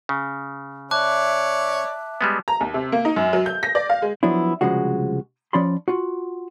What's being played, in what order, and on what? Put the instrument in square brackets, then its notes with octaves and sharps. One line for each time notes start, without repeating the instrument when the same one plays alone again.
[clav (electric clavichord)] C#3
[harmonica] C#5 D5 [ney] E5 [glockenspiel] A5 D6 F#6
[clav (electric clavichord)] G3 G#3 B3
[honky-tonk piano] A#5
D#2
C3
A#3
D#4
F#2
F#3
G6
A#6
D5
F5
G#3
[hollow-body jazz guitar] F3 F#3 B3 D4 E4
C2 F2 C#3 F3 G#3 F#4
F3 C#4 D5 B5 C6
F4 F#4